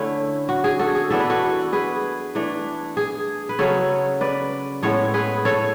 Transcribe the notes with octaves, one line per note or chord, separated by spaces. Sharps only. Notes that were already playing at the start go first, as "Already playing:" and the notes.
Already playing: D3 A3 C#4 E4
F#4
G#4
F#4 A4
G#4
E3 B3 D4 A4
B4
F#4 A4
G#4 B4
E3 A3 D4
G#4
B4
C#3 F#3 C#4 A4 C#5
B4 D5
A2 G#3 B3 A4 C#5
G#4 B4
A4 C#5